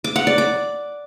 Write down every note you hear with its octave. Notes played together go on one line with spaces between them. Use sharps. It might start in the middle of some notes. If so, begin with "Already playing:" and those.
D6
F#5
D5
D6